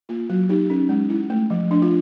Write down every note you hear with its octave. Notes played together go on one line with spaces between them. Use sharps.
A#3 F4
F#3 F#4
D#4 G4
C#4
G#3
E4
A3
F3
D4
F4